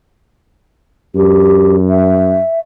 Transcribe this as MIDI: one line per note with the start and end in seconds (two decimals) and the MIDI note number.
1.15 2.38 42
1.15 1.77 67
1.89 2.60 76